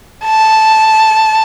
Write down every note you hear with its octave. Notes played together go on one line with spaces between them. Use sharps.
A5